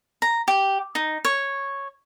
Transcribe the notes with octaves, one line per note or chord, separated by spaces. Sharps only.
A#5
G4
D#4
C#5